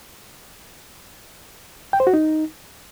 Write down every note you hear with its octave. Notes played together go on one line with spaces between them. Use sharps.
G5
C5
F#4
D#4